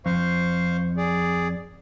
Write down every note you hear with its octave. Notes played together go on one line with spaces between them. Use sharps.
F2 C5 F5 C#6
G#4 D5